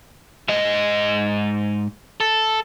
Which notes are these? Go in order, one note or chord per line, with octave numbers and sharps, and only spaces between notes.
G#2 D#5
A4